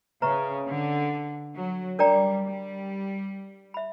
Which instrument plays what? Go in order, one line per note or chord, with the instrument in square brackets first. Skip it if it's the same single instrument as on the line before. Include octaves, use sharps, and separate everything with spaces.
[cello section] C#3 [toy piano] B4 E5 A#5 C#6
[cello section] D3
F#3
[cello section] G3 [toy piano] D4 A#4 D5 G5 A#5
[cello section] G3
[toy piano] E5 B5